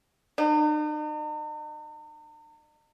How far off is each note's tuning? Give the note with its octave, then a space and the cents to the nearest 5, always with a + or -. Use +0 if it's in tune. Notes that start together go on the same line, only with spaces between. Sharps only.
D#4 -45